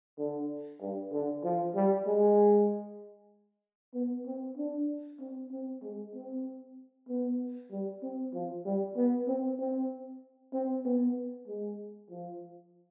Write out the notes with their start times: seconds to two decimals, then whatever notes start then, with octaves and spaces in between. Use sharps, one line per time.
0.18 D3
0.81 G2
1.12 D3
1.44 F3
1.75 G3
2.07 G#3
3.95 B3
4.26 C4
4.57 D4
5.20 C4
5.52 C4
5.83 G#3
6.15 C4
7.09 B3
7.71 G3
8.03 C4
8.34 F3
8.66 G3
8.97 B3
9.28 C4
9.60 C4
10.53 C4
10.85 B3
11.48 G#3
12.10 F3